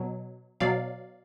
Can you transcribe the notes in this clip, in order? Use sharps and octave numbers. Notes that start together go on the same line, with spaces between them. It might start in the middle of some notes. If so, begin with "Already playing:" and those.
Already playing: B2 F#3
B2 F#3 D5 F5